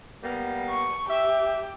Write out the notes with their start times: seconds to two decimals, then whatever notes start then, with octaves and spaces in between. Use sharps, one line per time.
0.23 G3 A#3 B3
0.70 C#6
1.10 G4 E5